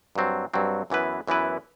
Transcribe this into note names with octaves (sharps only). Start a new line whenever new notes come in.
G2 F#3 C4
G2 F#3 C4
F#2 E3 B3 E4 B4
F#2 E3 B3 E4 B4